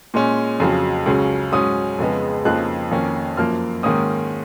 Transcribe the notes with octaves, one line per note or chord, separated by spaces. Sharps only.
A#2 G#3 C#4
F2 C#3 F#3
C#2 C#3 F#3 C#4
G#2 F#3 C#4 D#6
F2 C#3 G#3 B3
F2 C#3 F3 A#3 D#4 F#6
F2 D#3 A#3 C#4
F#2 F3 A#3 F6
G#2 D#3 A#3 C#4 D#6